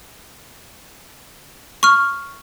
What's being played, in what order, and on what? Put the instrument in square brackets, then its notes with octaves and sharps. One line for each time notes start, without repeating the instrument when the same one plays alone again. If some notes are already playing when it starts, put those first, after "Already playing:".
[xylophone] C#6 F6